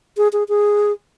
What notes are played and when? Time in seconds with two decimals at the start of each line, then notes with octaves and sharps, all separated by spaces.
0.17 G#4
0.33 G#4
0.49 G#4